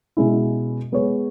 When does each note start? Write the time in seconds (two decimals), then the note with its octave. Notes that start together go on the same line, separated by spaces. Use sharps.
0.17 B2 G#3 C#4 E4
0.92 G#3 B3 G#4 C#5